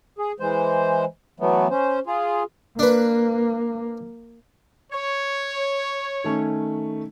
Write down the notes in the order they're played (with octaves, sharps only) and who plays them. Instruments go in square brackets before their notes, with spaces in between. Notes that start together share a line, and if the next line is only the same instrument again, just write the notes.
[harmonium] G#4
E3 G#3 C5
E3 F#3 A3 B3
C#4 C5
F4 G#4
[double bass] A#3 [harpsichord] D4 B4
[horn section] C#5
[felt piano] D#3 A3 C#4